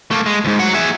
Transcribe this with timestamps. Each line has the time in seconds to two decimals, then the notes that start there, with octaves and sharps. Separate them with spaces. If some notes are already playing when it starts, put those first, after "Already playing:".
0.11 A3 A#3
0.26 G#3
0.45 D2 G#2
0.59 F#3 F#5
0.74 G#4 E5